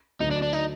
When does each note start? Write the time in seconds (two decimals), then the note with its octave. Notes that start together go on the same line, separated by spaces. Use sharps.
0.20 D2 D3 F#3 D#4
0.31 D4
0.42 D4
0.53 D#4